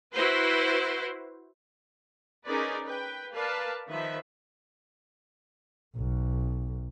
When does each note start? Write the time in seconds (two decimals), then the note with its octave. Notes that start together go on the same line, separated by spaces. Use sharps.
0.12 E4 F#4 B4 C5
2.45 C#4 D#4 G#4 A#4 B4 D5
2.84 B4 G5
3.33 A#4 B4 D5 F5 A5
3.89 D#3 F3 B4 E5
5.97 B1